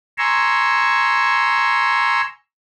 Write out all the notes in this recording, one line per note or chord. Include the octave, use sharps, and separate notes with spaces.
G#5 A#5 C6 C#6 E6